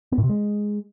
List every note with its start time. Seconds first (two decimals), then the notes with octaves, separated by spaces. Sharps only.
0.12 B3
0.18 A2
0.24 C3
0.29 G#3